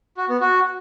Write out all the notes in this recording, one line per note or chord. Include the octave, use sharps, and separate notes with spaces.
F#4
B3
F#4